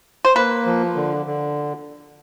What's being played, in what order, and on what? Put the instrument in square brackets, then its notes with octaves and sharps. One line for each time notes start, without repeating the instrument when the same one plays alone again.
[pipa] C5
[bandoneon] A#3 [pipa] B4
[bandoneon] F3
D3
D3